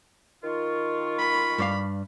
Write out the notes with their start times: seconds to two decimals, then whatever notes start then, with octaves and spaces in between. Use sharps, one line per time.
0.44 D#3 F4 C#6
1.19 B5
1.58 G2 D5 F5